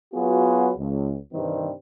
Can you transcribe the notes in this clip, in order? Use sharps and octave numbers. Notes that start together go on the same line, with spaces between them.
F#3 B3 F4 F#4 G#4 B4
C#2
G2 C3 D#3 E3 G3 C4